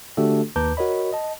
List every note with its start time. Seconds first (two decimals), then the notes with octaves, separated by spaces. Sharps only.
0.17 D3 A3 D4 F#4 G4 A4
0.56 D#2 B4 A5 A#5 D6 G6
0.77 F#4 A#4 C#5 D#5 B5
1.13 D#5 A5